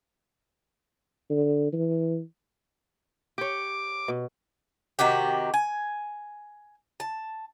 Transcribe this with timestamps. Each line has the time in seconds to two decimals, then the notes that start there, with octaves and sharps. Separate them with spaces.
1.30 D3
1.73 E3
3.38 G4 C#5 D6
4.08 B2
4.99 C3 D#3 F#4 G4
5.54 G#5
7.00 A5